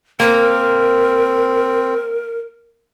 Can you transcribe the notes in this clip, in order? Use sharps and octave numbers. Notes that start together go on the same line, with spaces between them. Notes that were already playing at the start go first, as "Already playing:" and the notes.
A#3 C4 A#4